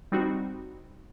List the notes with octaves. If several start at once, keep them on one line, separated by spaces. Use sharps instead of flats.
G3 C4 D#4 F#4